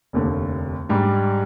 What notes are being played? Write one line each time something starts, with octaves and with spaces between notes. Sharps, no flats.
F1 D#2 D3
G#2 G3 D4